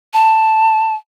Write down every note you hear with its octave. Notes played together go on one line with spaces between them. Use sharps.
A5